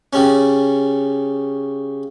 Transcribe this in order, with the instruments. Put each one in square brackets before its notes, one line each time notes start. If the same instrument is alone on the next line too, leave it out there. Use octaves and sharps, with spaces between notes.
[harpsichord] C#3 G3 C#4